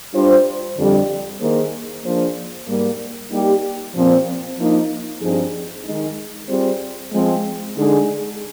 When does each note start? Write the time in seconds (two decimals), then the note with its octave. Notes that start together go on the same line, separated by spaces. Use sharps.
0.14 G3 D4 F4 C5
0.77 F2 D3 G3
1.40 D#3 A#3 D#4 G#4 C5
2.03 F3 A#3 D4 G#4 C5
2.68 G#2 G3 A#3
3.31 G3 A#3 D#4 G4
3.95 A#2 F3 C4
4.58 F3 A#3 D#4
5.22 G2 F3 C4 D#4 G#4
5.85 D#3 G#3 D#4
6.49 G3 C4 F4 G#4 C5
7.12 F3 G#3 C4
7.75 D3 G#3 D#4 G#4